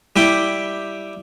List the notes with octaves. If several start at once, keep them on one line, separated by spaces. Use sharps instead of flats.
G3 E4 G5 D6